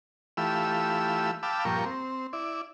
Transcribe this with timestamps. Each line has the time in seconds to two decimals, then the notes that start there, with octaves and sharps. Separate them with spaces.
0.37 E3 A3 F4 G4 B5 E6
1.43 F5 G5 A5 B5 D6 E6
1.65 G2 A#2 F3 A#4 G5 C#6
1.85 C4
2.33 E4 D5